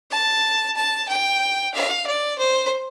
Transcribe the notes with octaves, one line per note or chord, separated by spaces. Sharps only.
A5
A5
G5
F5
D5
C5